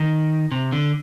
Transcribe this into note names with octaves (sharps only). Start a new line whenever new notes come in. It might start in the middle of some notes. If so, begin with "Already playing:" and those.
Already playing: D#3
C3
D3